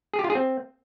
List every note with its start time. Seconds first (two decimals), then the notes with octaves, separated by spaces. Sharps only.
0.14 G#4
0.19 G4
0.24 F4
0.30 G#4
0.35 C4